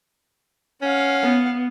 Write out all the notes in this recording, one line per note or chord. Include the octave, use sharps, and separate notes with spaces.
C#4 F5 F#5
B3